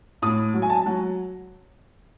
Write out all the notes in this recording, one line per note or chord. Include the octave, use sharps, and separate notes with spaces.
A2 D#6
F#3
G#5
A5
F#3